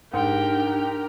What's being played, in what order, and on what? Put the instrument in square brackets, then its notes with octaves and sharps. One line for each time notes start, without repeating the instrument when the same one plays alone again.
[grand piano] G#2 [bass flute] D4 [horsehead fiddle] G4 A#4 [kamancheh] G5